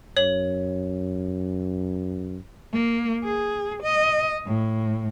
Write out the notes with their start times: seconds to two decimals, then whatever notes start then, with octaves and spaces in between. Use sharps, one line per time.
0.17 F#2 C#5 F#7
2.73 A#3
3.24 G#4
3.83 D#5
4.46 A2